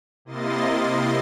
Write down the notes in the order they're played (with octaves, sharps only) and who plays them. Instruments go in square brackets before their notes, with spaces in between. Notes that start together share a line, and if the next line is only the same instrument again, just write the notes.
[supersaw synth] C3 A#3 E4 D#5 C6 A6